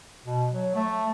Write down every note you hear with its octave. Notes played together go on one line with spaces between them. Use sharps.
B2
F#3
A3